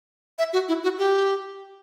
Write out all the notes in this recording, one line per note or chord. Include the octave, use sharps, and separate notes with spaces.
E5
F#4
E4
F#4
G4